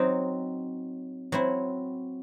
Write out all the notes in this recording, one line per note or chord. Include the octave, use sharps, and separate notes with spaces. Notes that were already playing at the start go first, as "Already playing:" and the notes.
Already playing: F#3 C4 D#4
F#3 C4 E4